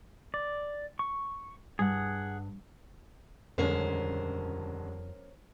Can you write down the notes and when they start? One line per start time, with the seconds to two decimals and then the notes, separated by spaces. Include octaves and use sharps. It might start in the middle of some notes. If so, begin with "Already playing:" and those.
0.34 D5
0.99 C#6
1.79 G2 G#4 F#5
3.58 D#1 F2 D3 G#3 C#4 A#4 C5